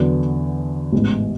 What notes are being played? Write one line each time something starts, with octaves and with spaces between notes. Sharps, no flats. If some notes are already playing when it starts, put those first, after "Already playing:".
Already playing: E2 D3 F#3 B3 D4
A1 G#2 G#3 B3